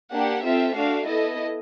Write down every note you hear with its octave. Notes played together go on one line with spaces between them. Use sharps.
A#3 D4 G4 F#5
C4 F4 A4 E5
A3 D4 F#4 F5
B3 E4 A4 D#5